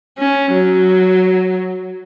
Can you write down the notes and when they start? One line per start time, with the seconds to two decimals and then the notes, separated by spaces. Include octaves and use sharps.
0.19 C#4
0.52 F#3